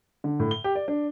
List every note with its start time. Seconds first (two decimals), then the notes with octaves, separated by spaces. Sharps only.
0.24 D3
0.40 A2
0.51 G7
0.64 G4
0.75 D5
0.88 D4